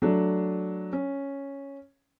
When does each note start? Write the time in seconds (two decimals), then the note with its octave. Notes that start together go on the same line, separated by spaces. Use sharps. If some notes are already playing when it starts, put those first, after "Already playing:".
0.02 F#3 A3 D4
0.93 C#4